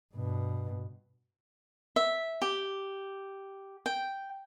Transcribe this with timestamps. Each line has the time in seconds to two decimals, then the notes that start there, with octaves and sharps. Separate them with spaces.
0.15 G2 B2
1.96 E5
2.42 G4
3.86 G5